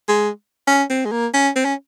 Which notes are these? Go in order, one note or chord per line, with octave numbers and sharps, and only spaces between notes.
G#3
C#4
C4
G#3
A#3
C#4
C4
C#4